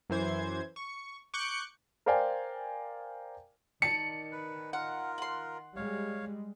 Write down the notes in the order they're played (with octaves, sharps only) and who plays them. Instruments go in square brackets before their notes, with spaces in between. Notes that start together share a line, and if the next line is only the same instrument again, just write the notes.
[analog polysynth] F#2 E3 C5 G#6
C#6
C#6 D6 F#6 G6 C#7
[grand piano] A#4 C5 D5 F5 G5 G#5
[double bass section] D#3 [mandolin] D5 A5 [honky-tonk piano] C#7
[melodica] B4
[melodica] F4 A#4 [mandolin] F#5
[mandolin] F#5 C6
[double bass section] G3 G#3 [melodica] C#5 F5